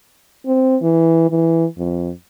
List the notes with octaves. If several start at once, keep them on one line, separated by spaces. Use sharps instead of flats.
C4
E3
E3
F2